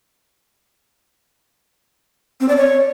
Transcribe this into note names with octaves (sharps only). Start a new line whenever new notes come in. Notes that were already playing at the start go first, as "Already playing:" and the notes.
C4
D5
C#5